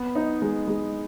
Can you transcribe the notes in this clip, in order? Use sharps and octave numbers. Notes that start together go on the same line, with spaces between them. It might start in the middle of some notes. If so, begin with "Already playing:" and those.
Already playing: B3
D#4
G#3
G#3